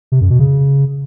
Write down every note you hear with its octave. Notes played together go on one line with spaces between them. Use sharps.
C3
F#2
B2
C#3